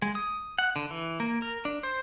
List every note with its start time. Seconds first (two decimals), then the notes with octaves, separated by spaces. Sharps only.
0.02 G#3
0.15 D#6
0.58 F#5
0.76 D3
0.90 E3
1.20 A#3
1.42 A#4
1.65 D4
1.83 C5